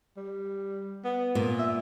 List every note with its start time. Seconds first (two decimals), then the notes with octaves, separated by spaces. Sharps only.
0.17 G3
1.05 B3
1.35 A#2
1.59 E5